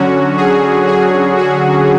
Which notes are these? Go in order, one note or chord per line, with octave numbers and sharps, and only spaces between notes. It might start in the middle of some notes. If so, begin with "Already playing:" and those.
Already playing: D3 F#3 C#4 F#4
G#4
G#4
F#4